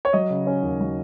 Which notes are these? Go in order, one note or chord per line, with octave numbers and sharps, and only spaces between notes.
C#5
F#3 D#5
C#3
C#4
D#2
F#3